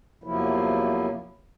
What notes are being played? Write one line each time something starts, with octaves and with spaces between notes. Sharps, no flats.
E2 C3 F3 F#3 A#3 E4